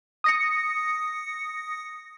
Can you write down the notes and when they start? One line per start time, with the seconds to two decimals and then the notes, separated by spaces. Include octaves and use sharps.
0.24 D#6 A#6 C#7